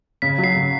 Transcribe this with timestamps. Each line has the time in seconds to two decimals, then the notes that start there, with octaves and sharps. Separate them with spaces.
0.22 C#3 B6
0.38 F#3
0.44 C7
0.55 C#3